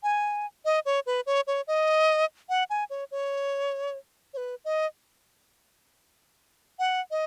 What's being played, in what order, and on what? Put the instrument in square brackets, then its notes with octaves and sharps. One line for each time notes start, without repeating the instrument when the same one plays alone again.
[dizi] G#5
D#5
C#5
B4
C#5
C#5
D#5
F#5
G#5
C#5
C#5
C#5
B4
D#5
F#5
D#5